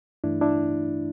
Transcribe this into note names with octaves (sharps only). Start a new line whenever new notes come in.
G2 E3 A3 D4 E4
D4 E4